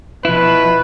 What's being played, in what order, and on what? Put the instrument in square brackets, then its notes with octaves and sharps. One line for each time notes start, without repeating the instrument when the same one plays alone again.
[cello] B2 [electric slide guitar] F3 E4 [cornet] B4